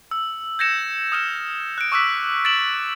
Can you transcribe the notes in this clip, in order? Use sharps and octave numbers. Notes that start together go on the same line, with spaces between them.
E6
G6 G#6 A#6 C#7 E7
D#6 F6 E7
F#6 D7
C#6 D6 E6 F#6 B6
A6 D7 E7 F#7